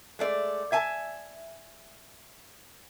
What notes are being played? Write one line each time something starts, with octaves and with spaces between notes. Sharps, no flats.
G#3 A3 D5
E5 G#5 A5